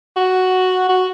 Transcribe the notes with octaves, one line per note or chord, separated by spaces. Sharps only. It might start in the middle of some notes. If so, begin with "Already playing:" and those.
F#4
F#4